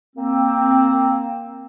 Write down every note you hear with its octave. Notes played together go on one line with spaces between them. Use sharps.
A#3 C4